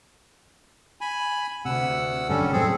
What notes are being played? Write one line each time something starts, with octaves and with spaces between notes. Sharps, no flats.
G#5 B5
D2 C3 F#5 E6
F#1 G2 D3 G3 C#4 A4
E2 A2 F#3 C4 G#4 A4